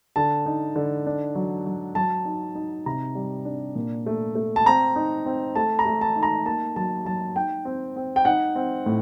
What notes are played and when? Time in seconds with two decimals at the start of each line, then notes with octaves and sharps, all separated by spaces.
0.16 D3 A5
0.46 D#4
0.76 D3
1.06 D4
1.35 F#3
1.66 F#3
1.95 F#3 A5
2.25 D#4
2.55 D#4
2.86 C3 A#5
3.15 G3
3.45 D4
3.75 A#2
4.06 A3
4.35 A3
4.56 A5
4.66 C4 A#5
4.96 D#4
5.26 C4
5.55 A3 A5
5.79 A#5
5.85 A3
6.01 A5
6.16 D#4
6.23 A#5
6.45 A#3 A5
6.76 F#3 A5
7.05 F#3 A5
7.36 D#4 G5
7.65 C4
7.96 C4
8.16 G5
8.25 D#4 F#5
8.55 C4
8.86 A2